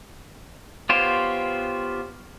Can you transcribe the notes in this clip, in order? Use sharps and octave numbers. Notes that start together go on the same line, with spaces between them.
B3 F4 G4 C5 C#5